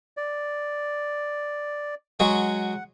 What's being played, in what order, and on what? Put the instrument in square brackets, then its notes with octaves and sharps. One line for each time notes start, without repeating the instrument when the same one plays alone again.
[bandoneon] D5
[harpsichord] F#3 G#3 C#6 [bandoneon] F#5